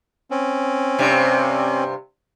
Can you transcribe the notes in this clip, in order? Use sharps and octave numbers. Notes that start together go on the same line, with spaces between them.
C4 C#4
G2 C3